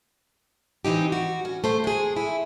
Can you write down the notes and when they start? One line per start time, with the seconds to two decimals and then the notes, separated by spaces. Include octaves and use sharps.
0.85 E3 C4 D#4 G4
1.12 F#4
1.45 C#4
1.64 A3 C5
1.84 G#3 G#4
2.16 E4